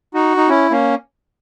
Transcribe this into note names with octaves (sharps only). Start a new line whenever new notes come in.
D#4 F#4
D#4
C#4 E4
A#3 C#4